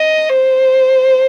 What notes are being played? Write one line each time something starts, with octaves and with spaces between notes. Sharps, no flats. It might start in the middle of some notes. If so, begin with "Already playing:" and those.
Already playing: D#5
C5